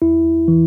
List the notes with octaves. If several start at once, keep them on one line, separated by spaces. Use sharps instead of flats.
E2 E4
E3